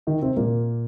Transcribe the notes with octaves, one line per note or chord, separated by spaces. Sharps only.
D#3 D#4
C3 C4
A#2 A#3